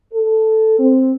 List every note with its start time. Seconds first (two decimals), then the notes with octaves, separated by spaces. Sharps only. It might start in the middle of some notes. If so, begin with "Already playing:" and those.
0.14 A4
0.79 C4